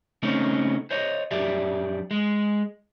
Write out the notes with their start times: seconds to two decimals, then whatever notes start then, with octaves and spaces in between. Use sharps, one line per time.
0.23 C#3 A3 C4 C#4 D#4
0.91 C5 C#5 D#5
1.31 F#2 G4 D5 E5
2.11 G#3